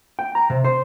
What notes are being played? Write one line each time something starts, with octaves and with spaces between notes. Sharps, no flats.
G5
A#5
C3
C5